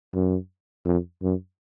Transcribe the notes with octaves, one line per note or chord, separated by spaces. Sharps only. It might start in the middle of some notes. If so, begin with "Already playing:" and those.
F#2
F2
F#2